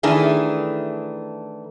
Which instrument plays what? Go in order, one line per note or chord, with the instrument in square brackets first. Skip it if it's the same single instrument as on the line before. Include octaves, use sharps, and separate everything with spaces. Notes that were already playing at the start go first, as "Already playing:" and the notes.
[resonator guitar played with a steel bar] D#3 E3 A3 D4 G#4